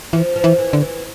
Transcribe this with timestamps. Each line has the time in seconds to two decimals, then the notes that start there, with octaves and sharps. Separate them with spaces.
0.13 E3 F3
0.36 F3
0.44 E3
0.58 E3
0.73 D3
0.81 E3